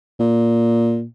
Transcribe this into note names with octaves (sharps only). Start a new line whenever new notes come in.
A#2